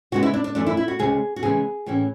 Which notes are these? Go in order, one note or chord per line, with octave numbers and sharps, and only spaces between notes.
C#3 G#3 B3 F#4
E4
D4
D4
F#2 E3 A3 D4
E4
E4
F#4
D2 C#3 G#3 G#4
F#4
C#3 E3 G#3 B3 G#4
A2 E3 A3 C#4